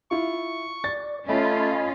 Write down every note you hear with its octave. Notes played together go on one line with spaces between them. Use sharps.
E4 F4 C#6
D5 A6
A3 C#4 F4 D#5 B5